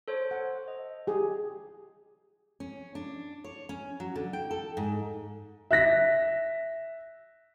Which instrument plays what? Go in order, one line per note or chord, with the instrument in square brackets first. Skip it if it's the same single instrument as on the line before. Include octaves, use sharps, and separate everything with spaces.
[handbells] A4 C5 C#5
[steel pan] F#5
[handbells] D#5
[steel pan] G4 G#4
[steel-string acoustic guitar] C#4
D4
C#5
C#4
F#3
D3
G5
A4
G#2
[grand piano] E5 F#6 A#6 B6